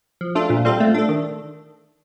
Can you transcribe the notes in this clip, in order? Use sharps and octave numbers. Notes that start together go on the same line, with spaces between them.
F3
A3 D4 F4 A4
A#2
G3 C4 F4 A4
A3
D4 A4
D#3